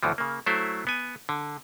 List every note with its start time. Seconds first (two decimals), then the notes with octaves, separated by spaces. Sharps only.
0.03 D2 A2 E3 F3
0.18 C#3 A#3
0.46 F#3 A3 E4 C5
0.87 B3 G#5
1.29 D3